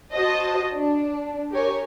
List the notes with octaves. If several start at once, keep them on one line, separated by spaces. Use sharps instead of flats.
F#4 C5 D#5 A5
D4
G4 A#4 C#5 G#5